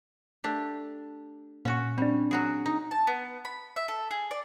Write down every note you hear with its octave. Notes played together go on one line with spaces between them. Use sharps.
A3 D4 G4
A#2 C#4 F#4 C#6
G3 C4 D4
F#3 F#4 G#4
D#4
A5
B3
B5
E5
A4
G#4
D5